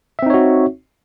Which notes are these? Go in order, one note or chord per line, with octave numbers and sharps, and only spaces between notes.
C4 D#4 F#4 C#5 E5